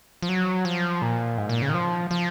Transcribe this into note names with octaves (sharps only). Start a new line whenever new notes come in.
F3
F#3
F3
A#2
G#2
A#2
C#3
D#3
F3
F3